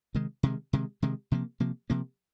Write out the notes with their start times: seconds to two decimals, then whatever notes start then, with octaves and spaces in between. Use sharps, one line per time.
0.15 C3 D#3 G#3
0.43 C3 D#3 G#3
0.73 C3 D#3 G#3
1.02 C3 D#3 G#3
1.32 C3 F3 A#3
1.60 C3 F3 A#3
1.90 C3 F3 A#3